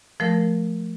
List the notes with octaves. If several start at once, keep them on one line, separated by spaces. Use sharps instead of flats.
F3 A3 A#4